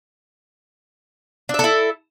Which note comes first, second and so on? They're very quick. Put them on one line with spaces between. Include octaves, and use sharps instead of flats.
D4 E5 A4 E4